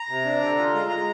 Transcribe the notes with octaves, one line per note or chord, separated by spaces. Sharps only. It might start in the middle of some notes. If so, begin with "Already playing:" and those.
Already playing: A#5
C3
D4
D3
F4
G#3 A#5
G#3